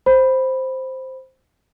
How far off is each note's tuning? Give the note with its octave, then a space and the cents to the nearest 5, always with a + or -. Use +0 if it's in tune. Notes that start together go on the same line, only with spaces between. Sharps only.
C5 +0 B5 +0